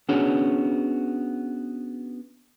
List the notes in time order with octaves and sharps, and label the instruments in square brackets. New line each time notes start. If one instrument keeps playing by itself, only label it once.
[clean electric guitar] B3 C#4 D4 F#4 G#4 C#5